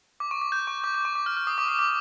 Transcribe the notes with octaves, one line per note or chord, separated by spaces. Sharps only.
D6
C#6
D6
G6
C#6
D6
D6
C#6
D6
F6
F6
D#6
D6
D#6
D6